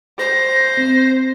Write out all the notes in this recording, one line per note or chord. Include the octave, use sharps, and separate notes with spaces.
C5 A#6
C4